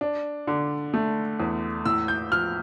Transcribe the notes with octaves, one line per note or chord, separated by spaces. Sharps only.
D4
D3
A3
E2
A2 E6
G6
F3 F6